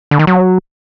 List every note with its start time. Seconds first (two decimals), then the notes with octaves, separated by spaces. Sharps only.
0.11 D3
0.19 D#3
0.27 F#3